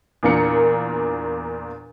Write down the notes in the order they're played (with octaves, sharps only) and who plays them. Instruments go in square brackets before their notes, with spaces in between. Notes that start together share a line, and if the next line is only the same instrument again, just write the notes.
[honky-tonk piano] E2 A#2 A#3 D4 A#4 C#7